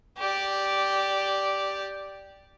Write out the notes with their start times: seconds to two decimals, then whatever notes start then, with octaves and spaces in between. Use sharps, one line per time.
0.18 G4 D5